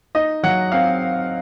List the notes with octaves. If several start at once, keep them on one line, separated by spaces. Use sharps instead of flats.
D#4 D#5
F#3 F#5
C4 F5